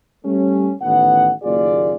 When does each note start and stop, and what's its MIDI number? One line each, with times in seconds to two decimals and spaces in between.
0.25 0.72 55
0.25 0.72 57
0.25 0.72 61
0.81 1.31 33
0.81 1.31 51
0.81 1.31 59
0.81 1.31 78
1.43 1.95 30
1.43 1.95 39
1.43 1.95 65
1.43 1.95 68
1.43 1.95 74